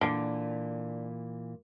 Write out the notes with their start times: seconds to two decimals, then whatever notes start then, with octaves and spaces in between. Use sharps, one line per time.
0.01 A#2 D3 E3